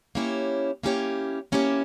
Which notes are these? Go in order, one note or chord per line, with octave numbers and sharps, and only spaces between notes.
A#3 C#4 E4 G4 C#5
A#3 C#4 E4 G4 C#5
A#3 C#4 E4 G4 C#5